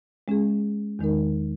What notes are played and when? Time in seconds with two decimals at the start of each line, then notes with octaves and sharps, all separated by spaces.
0.28 G#3 C#4 G#4
0.99 E2 D#3 G#3 D#4 A#4